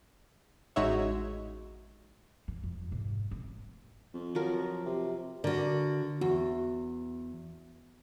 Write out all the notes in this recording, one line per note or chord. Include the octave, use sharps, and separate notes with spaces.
A1 G#3 D#4 F#4 C#5 E5
E3
F2
G#2 C3
C4
F2
F3 F#3 A#4
C3
D3 F#4 A#4 D5
E2 F#4